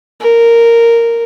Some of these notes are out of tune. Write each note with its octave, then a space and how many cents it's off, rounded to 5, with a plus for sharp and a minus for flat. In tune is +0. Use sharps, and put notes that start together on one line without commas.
A#4 -5